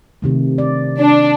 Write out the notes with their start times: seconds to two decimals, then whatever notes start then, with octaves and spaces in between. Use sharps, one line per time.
0.22 C3 D#3 A3
0.58 D5
0.99 D4